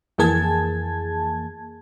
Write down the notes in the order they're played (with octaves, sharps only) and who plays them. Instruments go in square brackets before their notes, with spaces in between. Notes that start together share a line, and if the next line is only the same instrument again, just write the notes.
[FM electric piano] F2 E3 A#3 G#4 A5 G#6